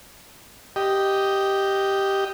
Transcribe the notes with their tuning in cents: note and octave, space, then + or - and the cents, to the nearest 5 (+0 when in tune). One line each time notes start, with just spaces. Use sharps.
G4 +0 D#5 +0